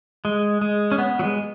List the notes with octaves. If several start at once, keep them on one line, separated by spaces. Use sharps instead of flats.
G#3
G#3
C#4
B3
F#3
G#3